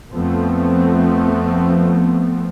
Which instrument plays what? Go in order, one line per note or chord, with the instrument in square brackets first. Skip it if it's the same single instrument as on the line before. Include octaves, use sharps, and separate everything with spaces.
[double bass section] F2 F3 A3 B3 C4